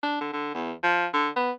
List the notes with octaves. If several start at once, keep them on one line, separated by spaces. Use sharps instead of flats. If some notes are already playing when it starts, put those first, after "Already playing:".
D4
D3
D3
E2
F3
D3
B3